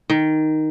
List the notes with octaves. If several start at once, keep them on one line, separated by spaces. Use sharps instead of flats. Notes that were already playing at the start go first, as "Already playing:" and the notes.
D#3